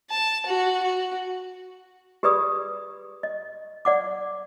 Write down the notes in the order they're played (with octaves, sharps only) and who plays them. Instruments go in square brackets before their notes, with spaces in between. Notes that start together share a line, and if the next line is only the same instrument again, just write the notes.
[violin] A5
F#4
F#4
[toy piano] G4 G#4 B4 D5 B5 D#6
D#5
D5 F#5 D6